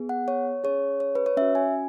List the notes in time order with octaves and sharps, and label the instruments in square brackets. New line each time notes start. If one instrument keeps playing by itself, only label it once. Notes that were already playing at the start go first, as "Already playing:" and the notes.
Already playing: [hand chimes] B3 G#4
F#5
C#5
C#4 G#4 C#5
C#5
B4
C#5
C#4 F#4 E5
G#5